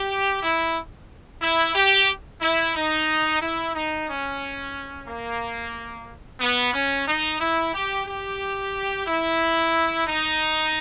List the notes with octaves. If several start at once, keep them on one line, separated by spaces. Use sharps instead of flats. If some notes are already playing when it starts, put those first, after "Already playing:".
Already playing: G4
E4
E4
G4
E4
D#4
E4
D#4
C#4
A#3
B3
C#4
D#4
E4
G4
G4
E4
D#4